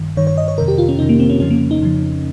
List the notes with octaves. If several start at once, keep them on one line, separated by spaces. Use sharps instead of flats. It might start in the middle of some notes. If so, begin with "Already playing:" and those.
Already playing: G2 D#3
G2 D#3 C#5
C#5
D#5
C#5
F2 C3 D#3 A#4
G4
F4
C#4
F2 C3 D#3 D#4
A#3
C4
C#4
F2 C#3 F3 C#4
A#3
D#4
F2 C#3 F3